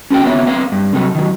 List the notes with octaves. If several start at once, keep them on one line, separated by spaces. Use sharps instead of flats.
C#4 F#4 A4 G5
B3 C4 F#4 C#5 D5 E5
B3 C4 F5
G2
C3 F#3 A4
D#3 F#3